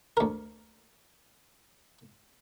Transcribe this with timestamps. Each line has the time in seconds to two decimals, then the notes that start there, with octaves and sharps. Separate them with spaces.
0.17 D2 A#4